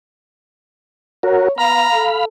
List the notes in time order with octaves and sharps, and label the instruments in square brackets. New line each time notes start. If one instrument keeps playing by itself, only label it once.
[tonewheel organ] F#4 A#4 [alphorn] C#5
[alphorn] B3 [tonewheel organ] F5 B5 [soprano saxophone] A#5
[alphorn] A4